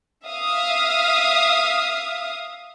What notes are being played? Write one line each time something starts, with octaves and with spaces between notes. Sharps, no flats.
E5 F5 D#6